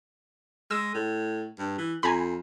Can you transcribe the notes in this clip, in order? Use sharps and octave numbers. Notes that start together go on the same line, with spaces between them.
G#3 E6
A2
G2
E3
F2 G#5 A#5 B5